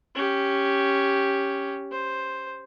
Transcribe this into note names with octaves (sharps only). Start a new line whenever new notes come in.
C#4 G4
C5